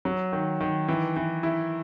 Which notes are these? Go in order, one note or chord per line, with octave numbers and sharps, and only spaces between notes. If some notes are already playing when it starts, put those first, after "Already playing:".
F#3
D#3
D#3
E3
E3
E4